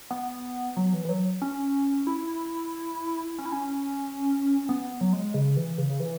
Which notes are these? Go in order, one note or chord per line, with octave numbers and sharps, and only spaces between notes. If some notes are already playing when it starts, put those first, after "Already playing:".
B3
F#3
E3
E3
F#3
C#4
E4
C#4
E4
C#4
B3
F#3
G#3
C#3
E3
C#3
C#3
E3